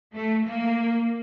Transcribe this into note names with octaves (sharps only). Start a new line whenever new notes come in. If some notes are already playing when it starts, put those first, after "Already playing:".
A3
A#3